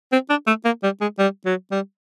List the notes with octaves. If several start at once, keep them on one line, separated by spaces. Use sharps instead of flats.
C4
D4
A3
A#3
G3
G#3
G3
F#3
G3